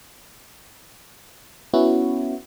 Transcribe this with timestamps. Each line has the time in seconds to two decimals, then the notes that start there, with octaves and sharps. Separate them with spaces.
1.74 B3 C#4 E4 F#4